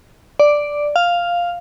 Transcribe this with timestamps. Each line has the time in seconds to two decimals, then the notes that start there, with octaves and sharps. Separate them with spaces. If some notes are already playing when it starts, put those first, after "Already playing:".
0.40 D5
0.96 F5